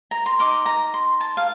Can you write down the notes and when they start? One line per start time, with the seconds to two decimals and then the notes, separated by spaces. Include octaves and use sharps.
0.11 A#5
0.26 C6
0.39 D#4 A#4 D#5 D6
0.66 A#5
0.94 C6
1.20 A5
1.37 F5